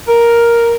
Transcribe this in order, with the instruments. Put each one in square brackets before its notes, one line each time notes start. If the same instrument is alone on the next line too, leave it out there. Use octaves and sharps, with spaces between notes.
[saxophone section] A#4